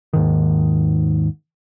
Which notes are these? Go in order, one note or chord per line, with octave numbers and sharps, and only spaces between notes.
D#2 G#2 D#3